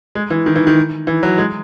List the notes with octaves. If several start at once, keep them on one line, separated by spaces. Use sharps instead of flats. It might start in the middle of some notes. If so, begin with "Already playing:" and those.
G#3
E3
D#3
E3
D#3
E3
F#3
G#3